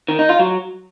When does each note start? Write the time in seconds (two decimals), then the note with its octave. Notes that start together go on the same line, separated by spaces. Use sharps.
0.08 D#3
0.19 D#4
0.29 F4
0.39 F#3